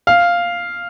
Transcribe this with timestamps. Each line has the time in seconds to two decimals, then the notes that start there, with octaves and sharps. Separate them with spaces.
0.07 F5